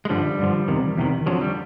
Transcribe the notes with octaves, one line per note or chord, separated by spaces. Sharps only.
G#3
G2 D3 F3 G3
G2 D3 F3
E2 C3 D#3
E2 C3 D#3
F2 D3 F3 F#3
G3